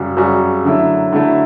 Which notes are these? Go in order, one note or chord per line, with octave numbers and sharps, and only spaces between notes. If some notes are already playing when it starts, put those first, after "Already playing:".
Already playing: F#2 C#3 G3 C#4 F#4
F#2 C#3 G3 C#4 F#4
D3 F#3 A3 E4
D3 F#3 A3 E4